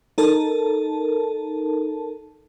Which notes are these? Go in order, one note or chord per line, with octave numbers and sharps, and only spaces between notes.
D#4 A4 A#4 A5